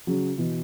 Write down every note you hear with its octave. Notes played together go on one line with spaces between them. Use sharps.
C#3 F#3
B2 E3